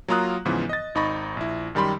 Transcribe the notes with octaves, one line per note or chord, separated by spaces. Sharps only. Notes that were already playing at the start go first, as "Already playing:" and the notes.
F#3 A#3 F4 A#5 D#6 F#6
G#2 C#3 E3 F3 B3
D#5 A6
G#1 D#4 D#5 B5 C#6 A#6
A#1 E4
F#2 D#3 G3 G4 B5 C6